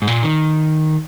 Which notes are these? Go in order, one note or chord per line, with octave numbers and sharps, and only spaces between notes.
G#2
A#2
D#3